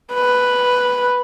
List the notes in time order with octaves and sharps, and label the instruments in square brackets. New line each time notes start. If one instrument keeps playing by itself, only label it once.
[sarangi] B4